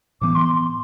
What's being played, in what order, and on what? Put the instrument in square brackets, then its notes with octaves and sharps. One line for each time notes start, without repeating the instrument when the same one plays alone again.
[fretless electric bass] A2 E3 B3 [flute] D6
[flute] C6